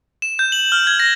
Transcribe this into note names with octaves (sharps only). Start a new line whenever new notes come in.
E7
G6
F#7
F6
G#6
A#6